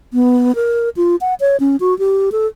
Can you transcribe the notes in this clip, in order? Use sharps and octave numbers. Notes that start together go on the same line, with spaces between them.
B3
A#4
F4
F#5
C#5
C#4
F#4
G4
A4